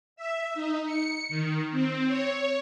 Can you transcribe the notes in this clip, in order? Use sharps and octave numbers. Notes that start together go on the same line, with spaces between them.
E5
D#4
C#7
D#3
C4
C#5